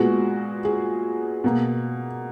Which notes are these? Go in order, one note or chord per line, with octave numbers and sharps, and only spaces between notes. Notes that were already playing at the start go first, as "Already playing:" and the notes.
Already playing: A#2 G#3 B3 F#4
G#4
B2 A#3